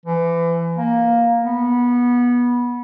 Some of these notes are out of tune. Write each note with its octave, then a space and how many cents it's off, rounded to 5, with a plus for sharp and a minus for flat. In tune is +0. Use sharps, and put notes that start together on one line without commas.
E3 +30
A#3 +5
B3 -20